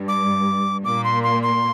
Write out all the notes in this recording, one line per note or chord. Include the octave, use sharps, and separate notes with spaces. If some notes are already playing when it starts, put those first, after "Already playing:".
Already playing: G2
D6
A#2 A#3 D6
C6
C6
C6